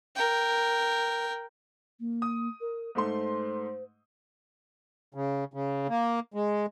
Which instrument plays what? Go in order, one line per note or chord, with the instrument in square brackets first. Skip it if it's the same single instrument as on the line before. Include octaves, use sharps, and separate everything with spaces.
[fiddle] A#4 G5
[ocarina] A#3
[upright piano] D#6
[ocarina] A#4
[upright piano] G#2 A3 C6 [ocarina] C5
[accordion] C#3
C#3
A#3
G#3